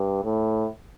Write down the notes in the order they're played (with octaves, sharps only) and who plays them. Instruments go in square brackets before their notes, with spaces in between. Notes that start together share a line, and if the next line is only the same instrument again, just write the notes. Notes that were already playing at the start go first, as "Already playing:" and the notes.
Already playing: [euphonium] G2
A2